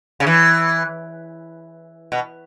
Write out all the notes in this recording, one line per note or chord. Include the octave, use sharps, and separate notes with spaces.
C#3
E3
B2